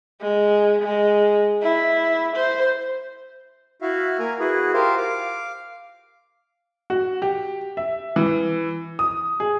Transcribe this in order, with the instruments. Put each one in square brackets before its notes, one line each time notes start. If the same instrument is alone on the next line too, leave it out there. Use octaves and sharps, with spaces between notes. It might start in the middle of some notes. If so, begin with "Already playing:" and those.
[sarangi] G#3
G#3
E4
C5
[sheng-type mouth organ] E4 F#4 E5 F5
A#3 A#4 G#5 A#5
E4 F#4 G#4 B4
F4 G4 A#4 C5 F5
F5 D6
[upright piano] F#4
G4
E5
E3
D#6
G#4